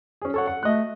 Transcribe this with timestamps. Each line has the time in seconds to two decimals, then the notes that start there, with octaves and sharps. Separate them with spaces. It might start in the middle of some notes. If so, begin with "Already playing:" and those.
0.22 C#4 G#4
0.34 A4 C#5 F#5
0.47 F#5
0.63 A3 D#5 F#6